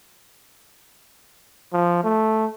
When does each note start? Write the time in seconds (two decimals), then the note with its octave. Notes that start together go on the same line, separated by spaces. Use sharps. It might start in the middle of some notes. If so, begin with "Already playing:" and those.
1.73 F3
2.04 A3